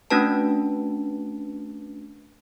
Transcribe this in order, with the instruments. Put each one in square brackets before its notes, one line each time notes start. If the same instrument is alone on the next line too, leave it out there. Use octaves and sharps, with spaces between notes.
[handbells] A3 C#4 D4 F#4 B4 A5